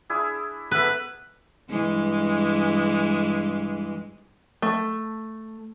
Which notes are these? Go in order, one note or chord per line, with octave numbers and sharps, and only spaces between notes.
D4 E4 G#4
B3 A4 B4 E5
G2 E3 G#3
A3